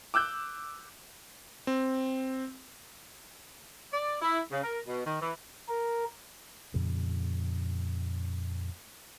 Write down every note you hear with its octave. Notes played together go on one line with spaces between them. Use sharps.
D6 E6 F#6 G6
C4
D5
E4
C#3
A#4
B2
D#3
E3
A#4
F2 A#2 C#3